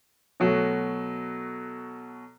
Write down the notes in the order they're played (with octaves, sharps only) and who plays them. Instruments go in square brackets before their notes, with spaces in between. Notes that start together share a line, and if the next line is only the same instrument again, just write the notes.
[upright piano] B2 F#3 A3